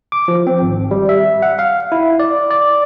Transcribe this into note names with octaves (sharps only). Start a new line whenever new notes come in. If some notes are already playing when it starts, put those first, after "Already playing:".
D6
F3
C4
G#1
G3
E5
F#5
F5
E4
D5
D5